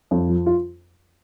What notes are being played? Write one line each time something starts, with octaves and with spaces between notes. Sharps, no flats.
F2
F3
F4